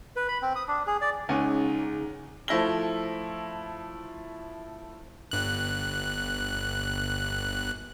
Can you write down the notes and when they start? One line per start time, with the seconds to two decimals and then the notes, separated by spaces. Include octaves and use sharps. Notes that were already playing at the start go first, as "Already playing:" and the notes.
0.16 B4
0.28 B5
0.42 C4
0.56 D#6
0.68 D4
0.87 G#4
1.01 D5
1.29 C#2 C#3 D#4 F#5 G#5 C#6
2.48 F3 A3 E4 A#6 G7
5.31 G1 F#6